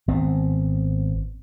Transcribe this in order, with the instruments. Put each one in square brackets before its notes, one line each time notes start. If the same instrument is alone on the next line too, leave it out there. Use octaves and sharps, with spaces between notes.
[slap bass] G#1 B3 C4